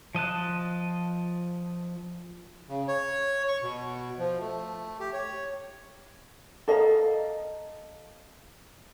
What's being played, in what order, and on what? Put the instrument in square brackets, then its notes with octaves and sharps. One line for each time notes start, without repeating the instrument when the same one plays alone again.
[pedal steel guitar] F3 D#5 A5 F#6
[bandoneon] C#3
C#5
C#6
B2
F3
A3
G4
C#5
[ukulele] A4 D#5 F5 A#5